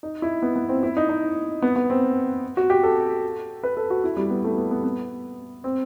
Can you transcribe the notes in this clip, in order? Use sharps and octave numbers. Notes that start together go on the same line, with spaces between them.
D#4
E4
B3
B3
C4
E4
D#4
D#4
B3
B3
C4
F#4
G4
A4
B4
A4
F#4
E4
G3
B3
A3
B3
B3
B3
C4